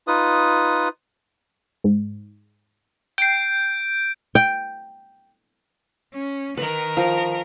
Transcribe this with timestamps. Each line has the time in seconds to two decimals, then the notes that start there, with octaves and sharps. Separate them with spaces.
0.07 D#4 F4 B4 D#6
1.84 G#2
3.18 G5 G6 C7 D7
4.35 G5
6.13 C#4
6.57 D#3 A#4 B4
6.97 F3